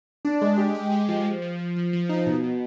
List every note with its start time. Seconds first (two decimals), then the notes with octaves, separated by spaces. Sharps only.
0.25 D4
0.41 G#3
0.58 G4
0.75 G4
0.92 G#3
1.09 F3
1.26 F3
1.42 F3
1.59 F3
1.76 F3
1.93 F3
2.09 D#4
2.26 B2
2.44 B2